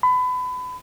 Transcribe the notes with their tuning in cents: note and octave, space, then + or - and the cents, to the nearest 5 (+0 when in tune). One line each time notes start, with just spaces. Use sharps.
B5 +30